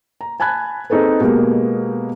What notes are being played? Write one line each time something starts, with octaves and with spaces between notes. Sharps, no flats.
A#5
G#5 A5 B5 F#6 G#6
C4 D#4 G#4 A4 B4
B2 G#3 A#3 B3 G4